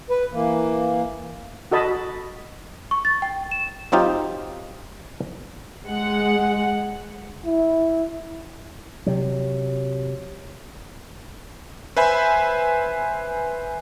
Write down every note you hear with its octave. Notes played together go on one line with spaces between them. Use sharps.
B4
E3 A#3
F#4 A4 D#5 A5 B5
C#6
A6
G5
E7
F#3 C4 D#4 F4 G4
G#3 F#5
E4
C3 F#3
B4 C5 E5 G#5 B5